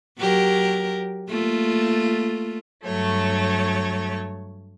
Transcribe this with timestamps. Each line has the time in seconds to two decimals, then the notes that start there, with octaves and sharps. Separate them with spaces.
0.18 F#3 G4 A#4
1.29 A3 A#3 F4
2.85 G2 F#3 A3 C#5